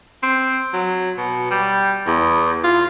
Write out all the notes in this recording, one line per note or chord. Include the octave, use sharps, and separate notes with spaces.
C4
F#3
B2
G3
E2
F4